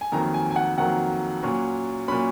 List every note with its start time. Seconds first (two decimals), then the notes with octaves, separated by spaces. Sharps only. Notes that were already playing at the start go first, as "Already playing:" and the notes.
0.01 G#5
0.12 F2 D#3 F#3 A#3 A#5
0.34 G#5
0.51 G#5
0.56 F#5
0.77 F2 D#3 F#3 A#3 F#5
1.43 A#2 F#3 C#4
2.08 A#2 F#3 C#4 B5